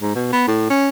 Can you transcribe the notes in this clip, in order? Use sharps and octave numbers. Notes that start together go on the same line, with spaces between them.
G#2
B2
B3
A2
C#4